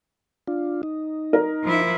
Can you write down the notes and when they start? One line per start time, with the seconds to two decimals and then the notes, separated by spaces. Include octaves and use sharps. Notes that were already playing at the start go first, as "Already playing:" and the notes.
0.48 D4 F4
0.83 D#4
1.33 A#4
1.63 F3 E4